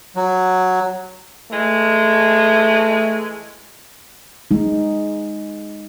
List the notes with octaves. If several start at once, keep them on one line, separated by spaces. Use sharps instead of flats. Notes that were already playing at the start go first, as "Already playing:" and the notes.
F#3
E3 G#3 A3
G#3 D#4